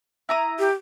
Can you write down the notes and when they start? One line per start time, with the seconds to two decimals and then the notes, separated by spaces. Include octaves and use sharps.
0.29 E4 A#5 D#6
0.59 G4